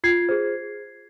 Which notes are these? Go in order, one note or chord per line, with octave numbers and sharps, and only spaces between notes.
F4 G#6 C7
G#4 C5